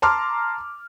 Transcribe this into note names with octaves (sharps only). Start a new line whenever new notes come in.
A5 A#5 C6 D6 F6